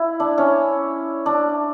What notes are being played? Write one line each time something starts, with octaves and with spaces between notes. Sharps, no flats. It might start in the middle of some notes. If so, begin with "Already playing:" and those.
Already playing: E4
D4
C#4
D4